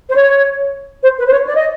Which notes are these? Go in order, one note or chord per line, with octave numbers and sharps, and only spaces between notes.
C5
C#5
C5
B4
C5
C#5
D5
D#5